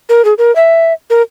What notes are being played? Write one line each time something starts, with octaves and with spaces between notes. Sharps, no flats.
A#4
G#4
A#4
E5
A#4